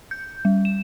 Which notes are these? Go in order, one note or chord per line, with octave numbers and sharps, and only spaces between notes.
G6
G3
E7